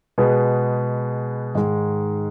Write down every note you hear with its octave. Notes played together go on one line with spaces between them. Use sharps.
B2 G#3 B3 G#4 B4
G#2 D#3 G#3